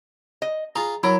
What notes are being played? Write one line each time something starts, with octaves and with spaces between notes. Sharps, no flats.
D#5
F4 G#4 A#5
F#3 E4 A#4